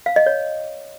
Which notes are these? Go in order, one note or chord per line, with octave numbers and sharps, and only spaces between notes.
F5
D#5
C#5